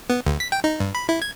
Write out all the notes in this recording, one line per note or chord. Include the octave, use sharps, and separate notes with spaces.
B3
D2
B6
G5
D#4
G2
B5
E4
G#6